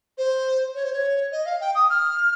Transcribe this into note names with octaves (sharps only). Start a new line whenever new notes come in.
C5
C#5
C5
C#5
D#5
F5
G5
D#6
F6